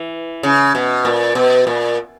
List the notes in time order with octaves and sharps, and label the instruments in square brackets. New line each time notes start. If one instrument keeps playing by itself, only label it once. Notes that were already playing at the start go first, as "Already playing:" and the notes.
Already playing: [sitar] E3
C#3
B2
A#2
B2
A#2